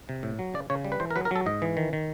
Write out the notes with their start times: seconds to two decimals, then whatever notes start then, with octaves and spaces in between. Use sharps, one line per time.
0.09 C3
0.23 A2
0.39 F#3
0.54 C#3 D5
0.70 C#3 C#5
0.85 G3
0.92 B4
1.00 E3 C5
1.11 A#4
1.16 F#3 B4
1.25 A#4
1.31 F#3 A4
1.46 G#2 D#5
1.62 E3
1.77 D#3
1.93 D#3